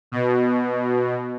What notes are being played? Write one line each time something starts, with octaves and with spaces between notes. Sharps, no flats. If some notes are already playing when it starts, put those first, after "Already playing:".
B2